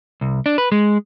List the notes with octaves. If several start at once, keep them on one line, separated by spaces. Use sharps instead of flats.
C2
D4
B4
G#3